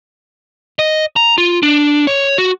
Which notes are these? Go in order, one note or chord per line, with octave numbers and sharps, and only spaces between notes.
D#5
A#5
F4
D4
C#5
F#4